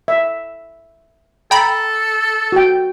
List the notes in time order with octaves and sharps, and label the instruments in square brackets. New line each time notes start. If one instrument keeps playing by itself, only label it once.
[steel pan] E5
[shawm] A4 [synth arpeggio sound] G5 A#5 B5
[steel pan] F#4 G5